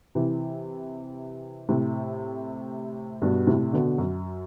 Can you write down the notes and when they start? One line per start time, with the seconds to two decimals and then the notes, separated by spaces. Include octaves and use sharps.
0.15 C3 E3
1.69 A2 C3
3.22 G2 B2
3.47 A2 C3
3.73 B2 D3
3.98 F#2